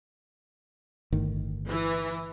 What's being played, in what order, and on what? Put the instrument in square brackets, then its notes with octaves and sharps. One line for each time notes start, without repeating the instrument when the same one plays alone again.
[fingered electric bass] G1 A2 D#3
[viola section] E3